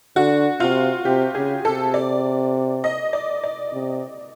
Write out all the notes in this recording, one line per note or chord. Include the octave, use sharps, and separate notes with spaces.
D3 F#4
C3 F4
C3 G4
C#3 G#4
C3 A4
D5
D#5
D5
D5
C3